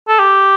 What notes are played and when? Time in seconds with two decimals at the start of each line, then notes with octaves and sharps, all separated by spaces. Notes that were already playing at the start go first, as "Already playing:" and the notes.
0.08 A4
0.19 G4